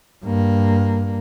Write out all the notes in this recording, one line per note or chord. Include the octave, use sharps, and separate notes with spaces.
G2 A#3